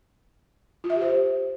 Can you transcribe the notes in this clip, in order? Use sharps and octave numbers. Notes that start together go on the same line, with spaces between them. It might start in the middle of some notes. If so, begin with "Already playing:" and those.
F4
E5
G4
C5